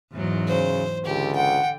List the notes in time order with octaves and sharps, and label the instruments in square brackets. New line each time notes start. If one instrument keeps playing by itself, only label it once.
[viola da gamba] E2 G#2 F#3
[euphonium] C#3 [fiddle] C5
[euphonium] C#2 [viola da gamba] D3 [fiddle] G4
[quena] F#5 [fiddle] G5